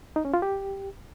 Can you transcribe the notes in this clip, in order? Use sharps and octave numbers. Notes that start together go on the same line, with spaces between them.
D#4
C#4
F4
G4